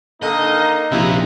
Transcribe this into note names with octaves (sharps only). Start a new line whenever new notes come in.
D3 D#3 A#3 D#4 A4 D#5
A#1 D#2 C3 E4 A#5